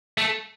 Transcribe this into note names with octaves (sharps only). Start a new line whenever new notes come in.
A3